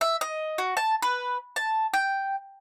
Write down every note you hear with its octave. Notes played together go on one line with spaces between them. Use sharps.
E5
D#5
F#4
A5
B4
A5
G5